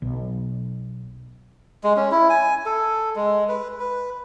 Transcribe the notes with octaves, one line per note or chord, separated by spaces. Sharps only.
B1
G#3
C#4
E4
G#5
A4
G#3
B4
B4